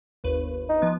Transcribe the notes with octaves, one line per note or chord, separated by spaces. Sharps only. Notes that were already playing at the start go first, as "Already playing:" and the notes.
G1 D#2 B4
D#4
F3 B3